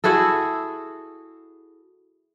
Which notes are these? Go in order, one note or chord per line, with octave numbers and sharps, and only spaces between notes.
E4 F#4 G#4 A4